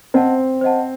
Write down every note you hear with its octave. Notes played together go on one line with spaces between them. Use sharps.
C4 C5 D#5 F#5 A5
C5 D#5 F#5 A5